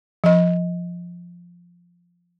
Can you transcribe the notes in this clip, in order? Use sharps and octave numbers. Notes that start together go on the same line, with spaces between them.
F3 D#5